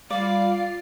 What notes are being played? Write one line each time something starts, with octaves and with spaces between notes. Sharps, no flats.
G3 F4 D5 F5 D6 C7